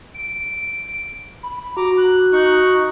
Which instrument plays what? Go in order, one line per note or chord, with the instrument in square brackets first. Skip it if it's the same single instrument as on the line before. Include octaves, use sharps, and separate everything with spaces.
[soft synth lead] D7
B5
[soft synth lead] F#4 [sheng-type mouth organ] A#5 D6
[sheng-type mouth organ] F#6
D#4 C#6 F#6